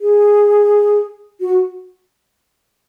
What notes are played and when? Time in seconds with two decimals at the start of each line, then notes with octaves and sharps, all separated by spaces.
0.01 G#4
1.40 F#4